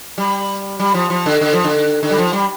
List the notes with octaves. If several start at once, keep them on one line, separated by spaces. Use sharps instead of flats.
G3
G3
F3
F3
D3
D3
F3
D3
D3
G3
F3
G3